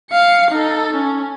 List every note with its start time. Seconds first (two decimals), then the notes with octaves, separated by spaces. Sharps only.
0.10 F5 C#7
0.50 D#4 A4
0.92 C#4